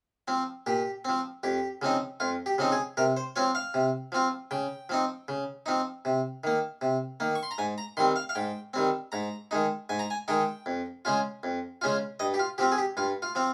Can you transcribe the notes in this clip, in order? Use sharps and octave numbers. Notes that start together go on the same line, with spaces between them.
F3 C4
A#2 G4
F3 C4
F2 G4
C#3 F3 C4 D#4
F2 F4
G4
C#3 F3 C4 D#4
G#4
C3 A#4
C5
F3 C4 F4 C#5
F5
C3
F3 C4 F4
C#3 G5
F3 C4 D#4
C#3
F3 C4 D#4
C3
D#3 A#3
C3
D#3 A#3
C#6
C6
A#5
G#2 G#5
A#5
D#3 G3 C4 C6
F5
F5
G#2 G5
D#3 G3 C4
G#2 A#5
D#3 G#3 D#4
G#2 G#5
A#5
G#5
D#3 G#3 D#4 G5
F2
C#3 G#3 C#4 F4
F2
C#3 G#3 C#4 F4
G2 D#5
G4
F4
F3 C4 F4 G4
G#4
G4
G2 F4
F4
F3 C4 F4